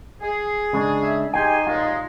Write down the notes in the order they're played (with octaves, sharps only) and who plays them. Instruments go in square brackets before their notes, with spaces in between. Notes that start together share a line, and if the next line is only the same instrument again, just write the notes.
[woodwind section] G#4
[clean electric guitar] C#3 G#3 D4
[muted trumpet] E5
[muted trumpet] D#4 [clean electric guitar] G4 G#4 G5 [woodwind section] G#5 C6
[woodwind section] D#2 A#2 G#3 [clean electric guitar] F4